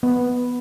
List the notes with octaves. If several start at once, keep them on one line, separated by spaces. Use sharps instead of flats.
B3